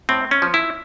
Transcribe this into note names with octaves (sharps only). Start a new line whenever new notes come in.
A2 C4
C#4
F3
E4